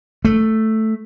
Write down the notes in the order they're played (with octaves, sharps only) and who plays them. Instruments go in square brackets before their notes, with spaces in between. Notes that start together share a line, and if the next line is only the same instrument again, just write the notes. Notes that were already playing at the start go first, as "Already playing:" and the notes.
[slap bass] A3